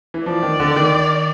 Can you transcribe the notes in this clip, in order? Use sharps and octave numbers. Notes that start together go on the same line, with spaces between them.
E3
F3 D5
D#3
D3
D#3